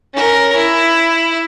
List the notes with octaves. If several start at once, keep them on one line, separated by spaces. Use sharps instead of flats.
C#4 A#4
E4